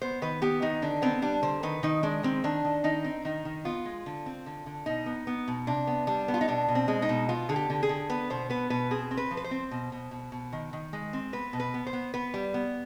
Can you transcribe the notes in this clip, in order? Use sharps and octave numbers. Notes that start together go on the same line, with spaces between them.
B3 C5
D#3 B4
B3 G4
D#3 D#4
D3 D4
B3 C4
G3 D4
D3 C5
D#3 B4
D#3 D#4
G#3 D4
D#3 C4
D#3 D4
D#3
D#3 D#4
C4
D#3 D#4
D#3
B3 F4
G#3
D3
C4
D3
D3
B2 D#4
B3
B3
B2
C3 D4
B3
G3 D4
B3
F4
D#4
B2 D4
B2
C4
G#3
D#4
B2
B3 F4
D3 G#4
G4
D3
G#4
D3
B3 B4
B2 C5
B3 B4
B2 B4
C4 G#4
C4
B4
F3
B4
C5
C4
B2
B2
B2
B2
D#3
D#3
G#3
C4
B3 B4
B2
B4
B3
C5
B3
B3 B4
G3
B3